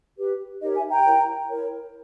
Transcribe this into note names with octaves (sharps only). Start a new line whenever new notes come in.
G4 B4
D#4 G4 A#4 C#5 D#5
E5 G#5
G5 A#5
E4 A#4 C#5
E4 A#4 C#5